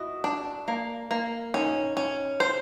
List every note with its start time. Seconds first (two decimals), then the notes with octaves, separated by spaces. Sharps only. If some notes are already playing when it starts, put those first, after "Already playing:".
Already playing: E4 F#4 D#5
0.24 D4
0.68 A#3
1.11 A#3
1.54 C#4 D#4
1.97 C#4
2.40 C5